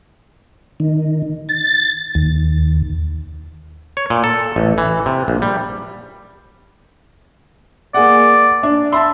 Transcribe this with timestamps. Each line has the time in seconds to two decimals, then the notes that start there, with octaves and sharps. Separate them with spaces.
0.80 D#3
1.49 A6
2.15 D#2
3.97 C#5
4.10 A#2
4.24 A4
4.56 A1
4.78 E3
5.06 C3
5.28 A#1
5.42 G3
7.94 A#3 G#4 D5 F#5
8.63 D4
8.93 E5 A5 B5 C6